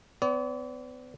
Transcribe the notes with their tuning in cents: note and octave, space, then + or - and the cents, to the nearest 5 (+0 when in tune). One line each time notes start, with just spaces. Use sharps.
B3 +40 D5 -40